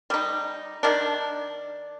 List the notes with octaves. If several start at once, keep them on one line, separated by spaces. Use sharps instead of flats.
G3 D#4
D#3 D4